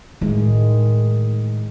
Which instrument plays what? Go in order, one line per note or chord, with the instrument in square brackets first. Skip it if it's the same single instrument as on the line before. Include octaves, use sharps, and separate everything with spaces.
[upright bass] A2 [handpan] D#3 G#3